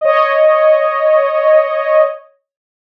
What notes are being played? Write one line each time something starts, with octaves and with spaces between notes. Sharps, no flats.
C#5 D#5